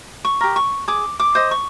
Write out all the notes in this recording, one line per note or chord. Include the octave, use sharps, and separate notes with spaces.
C#6
G4 A#4
C#6
G#4 D6
D6
C5 D#5
C#6